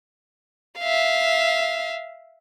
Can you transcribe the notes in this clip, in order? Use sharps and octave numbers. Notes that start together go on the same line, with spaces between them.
E5 F5